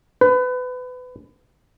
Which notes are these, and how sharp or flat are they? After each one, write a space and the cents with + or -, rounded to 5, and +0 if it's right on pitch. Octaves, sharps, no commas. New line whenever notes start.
B4 +30